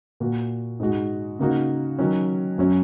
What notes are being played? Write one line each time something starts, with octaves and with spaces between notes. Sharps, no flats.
A#2 A#3 F#4
G#2 G#3 F#4
C#3 A#3 D#4 F#4
D#3 F#3 C#4
F#2 F#3 C#4